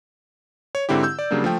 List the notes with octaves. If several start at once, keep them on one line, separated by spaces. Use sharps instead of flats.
C#5
G#2 D3 C4 E4 G4
E6 G6
D5
C#3 F#3 G3 A#3 D4
F3 A3 G5